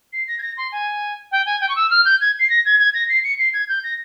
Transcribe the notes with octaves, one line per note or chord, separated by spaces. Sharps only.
C7
A#6
G#6
A#6
C6
G#5
G5
G#5
G5
C#6
E6
F6
G6
G#6
C7
A#6
G#6
G#6
A#6
C7
C#7
C7
G#6
G6
A#6